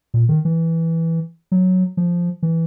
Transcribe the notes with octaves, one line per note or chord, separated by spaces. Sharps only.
A#2
D#3
E3
F#3
F3
E3